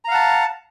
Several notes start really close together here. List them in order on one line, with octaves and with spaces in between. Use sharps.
A#5 F5 F#5 A5